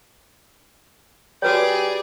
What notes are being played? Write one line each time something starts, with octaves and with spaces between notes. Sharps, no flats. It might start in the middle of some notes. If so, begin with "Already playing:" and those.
G3 F#4 G#4 B4 C#5 D5